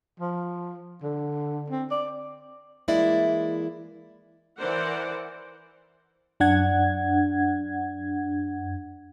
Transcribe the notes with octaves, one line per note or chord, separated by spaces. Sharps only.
F3
D3
C4
D5
E3 G#3 A#3 E4 D5 E5
E3 A#4 C5 D5 F#5
F#2 D4 F#5 G#6